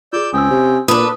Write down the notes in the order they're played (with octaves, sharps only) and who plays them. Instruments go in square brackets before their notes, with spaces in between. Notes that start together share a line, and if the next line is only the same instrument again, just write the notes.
[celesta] F4 G#4 [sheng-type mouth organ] D5 E6 G6
[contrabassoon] C#2 [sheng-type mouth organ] C4 C#4 G5 [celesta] D#6 E6
[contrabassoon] C3
[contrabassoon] A#2 [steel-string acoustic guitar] D4 B4 [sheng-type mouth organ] A4 [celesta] D#6